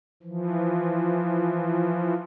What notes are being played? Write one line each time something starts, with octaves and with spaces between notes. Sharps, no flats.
E3 F3